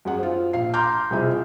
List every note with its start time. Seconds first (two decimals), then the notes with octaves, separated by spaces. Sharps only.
0.05 F#2 G#4 F#5
0.19 F4 C5
0.53 A#1 F5 C7
0.74 A#5 C6 D6 F6 G6
1.11 C2 F2 C3 G#4 E5